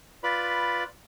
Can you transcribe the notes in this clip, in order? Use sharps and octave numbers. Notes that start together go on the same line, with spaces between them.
F4 B4 D5 B5